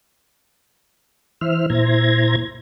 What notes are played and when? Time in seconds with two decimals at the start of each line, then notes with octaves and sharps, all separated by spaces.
1.41 E3 C5 E5 F6
1.70 A#2 E4 C5 A#5 G#6